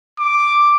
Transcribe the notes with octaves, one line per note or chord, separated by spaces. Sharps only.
D6